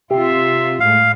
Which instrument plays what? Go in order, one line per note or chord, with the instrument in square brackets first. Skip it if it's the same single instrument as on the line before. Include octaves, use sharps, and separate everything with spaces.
[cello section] C3 F4 [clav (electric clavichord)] G4 [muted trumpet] E5
[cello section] A2 G#3 [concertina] F5